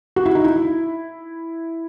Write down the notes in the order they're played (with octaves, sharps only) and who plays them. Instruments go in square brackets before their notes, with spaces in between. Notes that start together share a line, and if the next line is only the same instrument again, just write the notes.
[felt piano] F#4
E4
D#4
E4